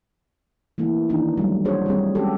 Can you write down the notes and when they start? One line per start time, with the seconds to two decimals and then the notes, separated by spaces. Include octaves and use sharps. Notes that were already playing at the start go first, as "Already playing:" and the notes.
0.78 E3 A3 A#3 E4
1.09 D#3 E3 A#3 D4 D#4
1.37 F#3 G3 A3
1.65 D4 F#4 G#4 C5 C#5
1.86 G3 A3 C4 G#4
2.15 G#3 A3 C#4 F#4 G4 A4